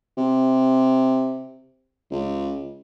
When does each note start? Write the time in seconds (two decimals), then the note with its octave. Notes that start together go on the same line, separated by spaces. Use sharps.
0.18 C3
2.11 C#2